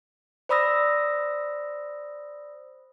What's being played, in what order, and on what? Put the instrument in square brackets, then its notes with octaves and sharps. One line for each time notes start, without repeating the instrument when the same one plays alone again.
[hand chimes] C5 D5 B5 D#6 E6 A#6